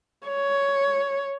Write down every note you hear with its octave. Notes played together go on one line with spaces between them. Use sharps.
C#5